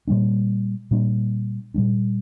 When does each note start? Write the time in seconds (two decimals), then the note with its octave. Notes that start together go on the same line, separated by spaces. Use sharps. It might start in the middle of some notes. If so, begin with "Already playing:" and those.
0.07 A#2 G3 A#3 D4
0.91 A#2 G3 A#3 D4
1.74 A#2 G3 A#3 D4